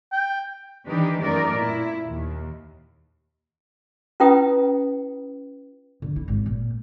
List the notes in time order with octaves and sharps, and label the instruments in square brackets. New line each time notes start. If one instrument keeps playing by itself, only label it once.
[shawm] G5
[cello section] D#3 E3 D4 D#4 G4 B4
F#2 A3 C4 D#4 A#4 D5
A#2 E4
D#2
[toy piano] C#4 E4 F4 B4 G5 D#6
[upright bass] D3
E4
G#1
A#2